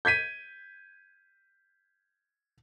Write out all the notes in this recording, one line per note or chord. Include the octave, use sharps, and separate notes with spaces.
G6 G#6 B6 D#7